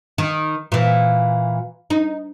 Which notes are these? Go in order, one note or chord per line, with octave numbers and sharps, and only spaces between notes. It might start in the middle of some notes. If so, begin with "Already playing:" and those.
D#3
A#2 E3
D#4